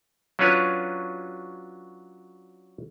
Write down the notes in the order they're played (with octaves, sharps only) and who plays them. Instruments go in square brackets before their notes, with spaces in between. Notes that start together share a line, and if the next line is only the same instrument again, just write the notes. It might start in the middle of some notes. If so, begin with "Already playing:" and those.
[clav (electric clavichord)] F#3 C#4 D4 F4 B4 C#5